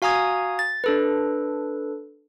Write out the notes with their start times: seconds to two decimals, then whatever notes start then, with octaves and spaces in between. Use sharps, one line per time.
0.02 F#4 F5 G#5 A#5 D#6 G#6
0.59 A6
0.84 D4 A4 B4